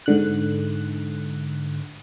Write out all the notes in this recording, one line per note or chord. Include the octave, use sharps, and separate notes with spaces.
G#2 D3 F#6